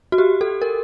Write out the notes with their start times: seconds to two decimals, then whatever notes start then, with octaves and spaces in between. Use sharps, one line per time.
0.12 F#4
0.18 G4
0.41 A4
0.62 A#4